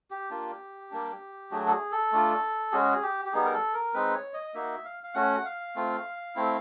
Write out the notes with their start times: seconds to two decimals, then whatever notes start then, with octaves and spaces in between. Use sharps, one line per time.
0.11 G4
0.30 A#3 D4 F4
0.91 G3 A#3 D4
1.51 F#3 A3 D4 F#4 G#4
1.67 A4
1.71 G#4
1.92 A4
2.12 A3 D4 F4
2.72 G#3 C#4 F#4 G#4
3.03 G4
3.25 G4
3.33 G3 B3 D#4 G#4
3.45 A#4
3.54 A4
3.74 A#4
3.94 G#3 C4 D#4 B4
4.14 C#5
4.34 D#5
4.54 A#3 D#4 F#4 E5
4.85 F5
5.04 F5
5.14 A3 C#4 F#4 F#5
5.45 F5
5.76 A3 C4 F4
6.36 A3 C4 E4